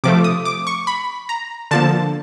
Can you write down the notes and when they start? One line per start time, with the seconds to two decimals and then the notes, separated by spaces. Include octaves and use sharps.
0.04 C3 F3 A3 D6
0.24 D#6
0.45 D6
0.67 C#6
0.87 B5
1.29 A#5
1.71 D3 F3 A#3 A5